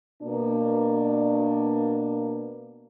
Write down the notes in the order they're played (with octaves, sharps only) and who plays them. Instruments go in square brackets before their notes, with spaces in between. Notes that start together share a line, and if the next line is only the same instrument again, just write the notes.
[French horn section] B2 A#3 D4